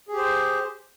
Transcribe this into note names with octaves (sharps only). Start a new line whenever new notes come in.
G4 G#4 C5